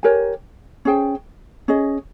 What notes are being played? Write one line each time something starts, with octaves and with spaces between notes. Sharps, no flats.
G4 A#4 C#5 G#5
C#4 G#4 C5 G5
C#4 G#4 D#5